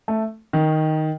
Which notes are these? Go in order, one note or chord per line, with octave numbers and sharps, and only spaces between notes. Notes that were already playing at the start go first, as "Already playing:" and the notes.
A3
D#3